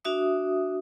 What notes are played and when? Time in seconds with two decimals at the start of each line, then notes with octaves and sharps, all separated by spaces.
0.05 D4 F#4 E5 D#6